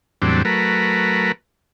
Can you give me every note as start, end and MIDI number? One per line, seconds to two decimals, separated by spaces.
0.22 0.42 40
0.22 0.42 45
0.22 0.42 54
0.22 0.42 55
0.22 0.42 60
0.22 0.42 62
0.45 1.32 54
0.45 1.32 57
0.45 1.32 70
0.45 1.32 71